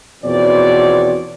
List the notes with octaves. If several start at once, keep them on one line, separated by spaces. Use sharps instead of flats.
E2 B2 F3 C4 C#5 D5